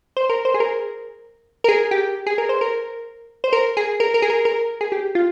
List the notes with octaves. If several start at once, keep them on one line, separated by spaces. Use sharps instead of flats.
C5
A#4
C5
G#4
A#4
A#4
G#4
G4
G#4
A#4
C5
A#4
C5
A#4
G#4
A#4
A#4
G#4
A#4
A#4
G#4
G4
F4